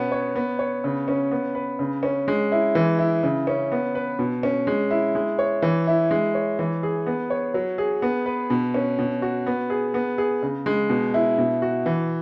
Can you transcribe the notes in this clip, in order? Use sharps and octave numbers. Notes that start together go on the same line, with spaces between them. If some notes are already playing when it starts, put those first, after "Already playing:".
Already playing: B2 B3 C#4
C#5
B3
C#5
C#3
C#4
B3
B4
C#3
C#4
G#3
E4
E3
E4
C#3
C#4
B3
B4
B2
C#4
G#3
E4
G#3
C#5
E3
E4
G#3
C#5
E3
G#4
B3
C#5
F#3
G#4
B3
B4
B2
C#4
B2
F#4
B3
G#4
B3
G#4
C#3
G#3
B2
E4
B2
F#4
E3